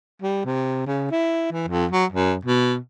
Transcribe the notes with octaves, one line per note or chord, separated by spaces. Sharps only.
G3
C3
C#3
E4
E3
F2
F#3
F#2
B2